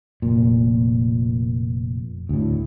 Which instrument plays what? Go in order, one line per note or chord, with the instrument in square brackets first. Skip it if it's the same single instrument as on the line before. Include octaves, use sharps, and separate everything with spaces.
[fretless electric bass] F1 A#2
D2 A2